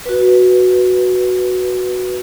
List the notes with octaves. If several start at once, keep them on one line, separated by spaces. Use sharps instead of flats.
F#4 B4